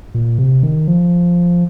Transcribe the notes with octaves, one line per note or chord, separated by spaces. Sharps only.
A#2
C3
D#3
F3